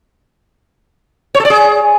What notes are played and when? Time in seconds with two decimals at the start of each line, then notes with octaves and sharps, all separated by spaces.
1.35 C#5
1.40 A4
1.45 D5
1.50 G#4